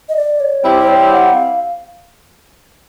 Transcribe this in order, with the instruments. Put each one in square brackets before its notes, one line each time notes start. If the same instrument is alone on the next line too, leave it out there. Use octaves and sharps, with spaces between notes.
[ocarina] D#5
D5
C#5
[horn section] G3 C4 E4 G4 [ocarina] C5
[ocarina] C5
C#5
F#5
F5